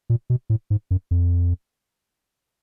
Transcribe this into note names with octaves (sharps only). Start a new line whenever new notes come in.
A#2
B2
A2
G#2
F#2
F2